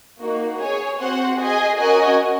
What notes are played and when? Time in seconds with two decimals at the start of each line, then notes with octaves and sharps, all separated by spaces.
0.20 A#3 D#4 F#4
0.59 G#4 C#5 G#5
0.99 C4 F#4 C5 F#5
1.38 G#4 D#5 G#5
1.77 C#4 F#4 A#4 D#5 G#5